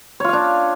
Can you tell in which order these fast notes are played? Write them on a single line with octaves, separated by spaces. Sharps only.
C#5 F4 F5 D4